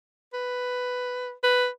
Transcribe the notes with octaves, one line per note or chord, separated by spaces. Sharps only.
B4
B4